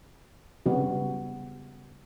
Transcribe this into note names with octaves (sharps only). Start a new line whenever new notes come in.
C#3 G3 B3 F#4